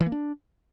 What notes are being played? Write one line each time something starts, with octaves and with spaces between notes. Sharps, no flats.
E3
A#3
D4